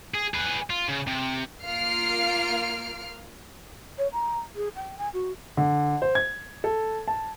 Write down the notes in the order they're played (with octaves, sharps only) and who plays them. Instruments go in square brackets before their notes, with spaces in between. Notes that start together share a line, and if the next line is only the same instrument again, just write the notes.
[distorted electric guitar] G#4
G#4 B4
F4
C#3
C3
[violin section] A#3 F4 F6 C7 D7
[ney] C#5
A#5
G#4
G5
G#5
F#4
[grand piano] D3
C5
G#6
A4
A5